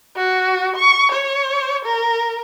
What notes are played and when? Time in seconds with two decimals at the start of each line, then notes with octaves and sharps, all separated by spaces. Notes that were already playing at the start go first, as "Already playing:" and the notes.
0.16 F#4
0.76 C#6
1.12 C#5
1.85 A#4